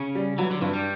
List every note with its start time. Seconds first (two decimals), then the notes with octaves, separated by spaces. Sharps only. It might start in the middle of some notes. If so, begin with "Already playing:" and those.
Already playing: C#3 C#4
0.15 G3
0.38 E3 F#3
0.51 D3
0.61 G2 E3
0.73 G3